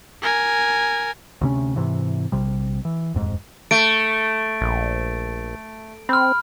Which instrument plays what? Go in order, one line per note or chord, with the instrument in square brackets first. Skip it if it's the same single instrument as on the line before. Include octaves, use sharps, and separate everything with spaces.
[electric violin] A#4 G#5
[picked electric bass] D2 C3 C#4
G#2 C3 E3
A#1 C3 G3
E3
D#1 F2 G#2
[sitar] A3 [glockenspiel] D7
[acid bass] A#1
[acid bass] C4 [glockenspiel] B5 F6